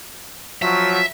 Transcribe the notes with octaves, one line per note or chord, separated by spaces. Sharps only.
F3 F#3 E5